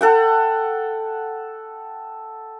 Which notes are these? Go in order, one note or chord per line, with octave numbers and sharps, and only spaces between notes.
A4 F#5 G5